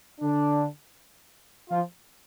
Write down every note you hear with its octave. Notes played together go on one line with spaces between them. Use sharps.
D3 D4
F3 F4